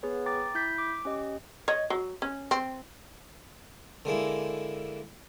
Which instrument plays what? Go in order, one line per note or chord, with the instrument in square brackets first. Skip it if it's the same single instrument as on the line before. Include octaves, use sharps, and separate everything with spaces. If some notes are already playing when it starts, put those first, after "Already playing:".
[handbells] B3 G#4 B4 C#5
G5 A#5 D6 A6
E4 G6 B6
D6
C#4 G4 D#5
[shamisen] C#5 D#5
F#3
C#4
C4
[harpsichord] D3 G#3 A#3 E4